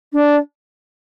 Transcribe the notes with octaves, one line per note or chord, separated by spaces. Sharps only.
D4